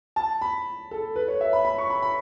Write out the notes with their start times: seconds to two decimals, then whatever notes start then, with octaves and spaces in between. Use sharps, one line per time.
0.16 A5
0.42 B5
0.91 A4
1.16 B4
1.28 C#5
1.41 E5
1.53 B5
1.65 B5
1.78 C#6
1.90 B5
2.02 B5